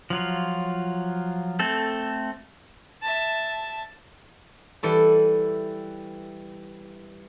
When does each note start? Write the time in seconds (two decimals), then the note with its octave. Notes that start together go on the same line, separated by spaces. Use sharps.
0.10 F3 F#3 F4
1.59 A3 C4 A4
3.02 E5 A5
4.83 E3 G3 E4 A4